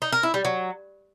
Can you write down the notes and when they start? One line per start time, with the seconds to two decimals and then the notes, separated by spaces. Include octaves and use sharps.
0.02 D#4
0.12 A#4
0.23 E4
0.34 G3
0.45 F#3